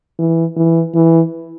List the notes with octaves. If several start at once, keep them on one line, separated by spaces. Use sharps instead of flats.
E3
E3
E3